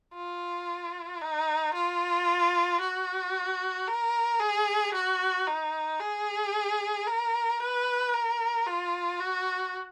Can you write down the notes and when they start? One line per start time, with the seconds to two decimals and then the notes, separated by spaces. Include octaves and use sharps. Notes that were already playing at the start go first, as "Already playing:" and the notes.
0.14 F4
1.21 D#4
1.74 F4
2.81 F#4
3.87 A#4
4.40 G#4
4.94 F#4
5.47 D#4
6.00 G#4
7.07 A#4
7.60 B4
8.14 A#4
8.67 F4
9.20 F#4